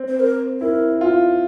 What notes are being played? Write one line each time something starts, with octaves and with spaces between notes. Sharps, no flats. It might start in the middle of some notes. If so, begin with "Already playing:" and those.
Already playing: C4
C5
A#4
E4 A#4
F4